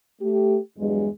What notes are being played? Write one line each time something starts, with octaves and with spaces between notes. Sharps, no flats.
A3 G4
E2 G2 F#3 G#3